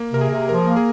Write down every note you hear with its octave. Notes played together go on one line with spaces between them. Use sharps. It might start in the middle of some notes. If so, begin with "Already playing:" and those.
Already playing: A#3
C3 A#4
G#4
C3
F3 A#4
A#3
G#4